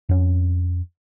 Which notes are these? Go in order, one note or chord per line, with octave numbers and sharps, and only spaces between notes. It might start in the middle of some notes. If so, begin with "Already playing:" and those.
F2 C#4